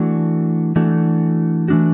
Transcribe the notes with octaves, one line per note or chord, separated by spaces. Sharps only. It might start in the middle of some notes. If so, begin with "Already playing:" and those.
Already playing: E3 A3 D4 F#4
E3 A3 D4 F#4
E3 A3 D4 F#4